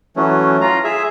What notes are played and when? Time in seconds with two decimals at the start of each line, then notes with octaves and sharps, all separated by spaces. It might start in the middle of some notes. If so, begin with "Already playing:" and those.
0.16 E3 F#3 A3 C#4
0.61 F4 A#5
0.84 G#4 E5